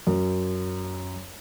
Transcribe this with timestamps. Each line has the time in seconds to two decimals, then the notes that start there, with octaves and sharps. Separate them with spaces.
0.07 F#2